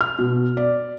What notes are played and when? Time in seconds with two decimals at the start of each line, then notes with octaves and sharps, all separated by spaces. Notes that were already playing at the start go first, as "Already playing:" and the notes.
0.01 F6
0.19 B2
0.57 D5